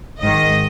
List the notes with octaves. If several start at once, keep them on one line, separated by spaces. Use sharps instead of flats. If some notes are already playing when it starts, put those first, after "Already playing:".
G#1 G#2 D#3 D#5